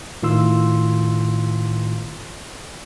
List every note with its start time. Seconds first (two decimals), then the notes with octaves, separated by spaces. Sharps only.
0.23 A2 D#3 F4 C6 E6